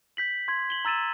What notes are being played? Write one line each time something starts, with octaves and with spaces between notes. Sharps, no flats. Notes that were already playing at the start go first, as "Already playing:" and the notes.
G6 B6 F#7
C6 G#6
F#7 G7
A#5 E6 A6 D#7 E7